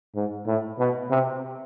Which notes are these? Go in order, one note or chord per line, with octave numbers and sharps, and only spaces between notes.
G#2
A2
B2
C3